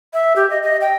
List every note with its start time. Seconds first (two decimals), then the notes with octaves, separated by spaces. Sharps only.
0.14 E5
0.36 G4
0.50 D#5
0.63 D#5
0.81 G5